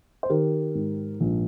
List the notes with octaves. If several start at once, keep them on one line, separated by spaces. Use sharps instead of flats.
C5
D#3 G4 A#4
G#2
A#1